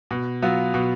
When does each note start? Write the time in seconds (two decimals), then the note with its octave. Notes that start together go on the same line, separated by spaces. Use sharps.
0.11 B2
0.42 F#3 B3 F4
0.74 B2